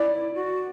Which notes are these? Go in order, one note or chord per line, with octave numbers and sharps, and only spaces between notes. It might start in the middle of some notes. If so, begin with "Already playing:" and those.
Already playing: E4 D5
F#4